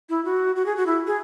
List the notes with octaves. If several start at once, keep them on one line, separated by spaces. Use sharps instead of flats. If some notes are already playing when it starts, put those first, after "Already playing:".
E4
F#4
F#4
G#4
F#4
E4
G#4